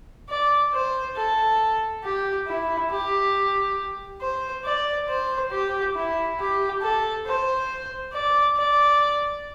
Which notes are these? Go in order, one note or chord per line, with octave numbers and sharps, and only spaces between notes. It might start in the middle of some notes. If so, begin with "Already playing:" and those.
D5
C5
A4
G4
E4
G4
C5
D5
C5
G4
E4
G4
A4
C5
D5
D5